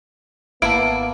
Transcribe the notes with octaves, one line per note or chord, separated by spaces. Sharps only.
G#1 A#3 B3 E4 F5 A5 D7